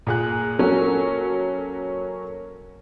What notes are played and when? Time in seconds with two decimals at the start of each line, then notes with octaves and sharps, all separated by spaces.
0.07 A#2 G#4 F#6
0.59 F#3 A#3 C#4 F#4 A4 A#4